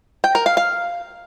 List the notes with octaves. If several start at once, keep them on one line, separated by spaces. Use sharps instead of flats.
G5
A#4
F5
F5